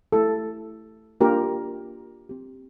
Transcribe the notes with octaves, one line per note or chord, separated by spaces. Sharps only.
A3 E4 G4 A4
A#3 D4 F4 G4 A#4
C4 G4